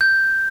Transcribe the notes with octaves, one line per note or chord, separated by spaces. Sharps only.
G6